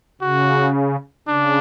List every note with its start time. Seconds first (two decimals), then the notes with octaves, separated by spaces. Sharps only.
0.22 C#3 F#4
1.28 C#3 D4